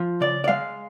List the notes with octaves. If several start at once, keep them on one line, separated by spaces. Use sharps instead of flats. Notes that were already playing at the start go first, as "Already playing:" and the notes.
Already playing: F3
C#3 D5
D5
G#3 F5